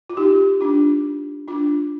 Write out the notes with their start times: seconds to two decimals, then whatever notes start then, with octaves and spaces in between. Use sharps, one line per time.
0.10 F4
0.17 D#4 G4
0.61 D4 F4
1.48 D4 F4